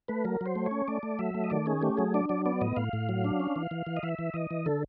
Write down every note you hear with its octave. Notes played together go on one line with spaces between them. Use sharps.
A3 B4
F#3 A#4
F#3 C5
A3
C#5
C#4
A3 D5
A3
F#3 E5
A3
D#5
D#3 D5
C#4 G#4
A3 G4
F#3 G#4
D4 D5
F#3 D5
B3 D5
A2 D#5
A2 F5
A2
F#3
D4
C#4
E3
E3
E3
D#5
E3 E5
E3
E3 D#5
E3
D3 A4